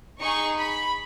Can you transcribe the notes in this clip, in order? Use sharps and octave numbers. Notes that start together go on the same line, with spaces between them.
D#4 G#4 C#6
B5